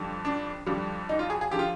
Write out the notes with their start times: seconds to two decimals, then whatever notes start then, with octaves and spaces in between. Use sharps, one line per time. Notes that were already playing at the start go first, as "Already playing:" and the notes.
Already playing: F2 D3 G3
0.25 D4
0.66 F2 D3 G3
1.09 D#4
1.19 F4
1.30 G#4
1.41 G#4
1.51 D3 F3 G4
1.59 F4